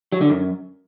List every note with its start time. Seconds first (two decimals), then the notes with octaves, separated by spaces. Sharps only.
0.12 F#3
0.21 D3
0.29 F#2